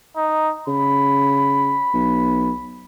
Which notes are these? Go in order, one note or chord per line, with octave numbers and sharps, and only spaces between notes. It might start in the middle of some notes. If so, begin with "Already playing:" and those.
D#4
C#3 B5
B1